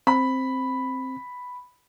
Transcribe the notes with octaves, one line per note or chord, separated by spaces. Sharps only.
C4 B5